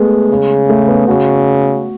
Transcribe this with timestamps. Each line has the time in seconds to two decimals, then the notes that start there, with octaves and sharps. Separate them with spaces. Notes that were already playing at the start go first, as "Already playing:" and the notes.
Already playing: G#3 A3 B3
0.31 C#3
0.69 A3
0.88 B3
1.07 C#3 F#4